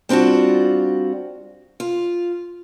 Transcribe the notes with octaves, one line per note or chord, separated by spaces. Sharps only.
G3 C4 D4 F4 F#4
F4